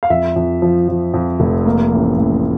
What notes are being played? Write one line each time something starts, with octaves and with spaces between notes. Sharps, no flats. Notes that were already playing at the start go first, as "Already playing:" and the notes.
F5
F2 E5
F2
F3
F3
F2
F1
A#3
A1
A1